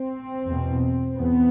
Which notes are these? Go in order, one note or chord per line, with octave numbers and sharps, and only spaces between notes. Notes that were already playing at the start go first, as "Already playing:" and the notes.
Already playing: C4
E2 B2
E2 B3